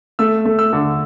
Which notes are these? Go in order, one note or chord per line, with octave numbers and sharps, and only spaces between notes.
A3 E6
A3
E6
D3